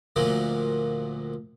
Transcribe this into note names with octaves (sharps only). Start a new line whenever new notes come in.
D2 A#2 F3 F#3 A#3